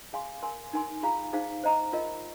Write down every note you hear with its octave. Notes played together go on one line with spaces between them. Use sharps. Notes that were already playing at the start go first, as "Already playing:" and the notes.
G#4 F5 G#5 C6
A#4 G#5 C6
D#4 A#4 G#5 C6
F4 G#4 F5 A#5
D#4 G#4 C5 F5
C5 D#5 A#5
F4 A#4 D#5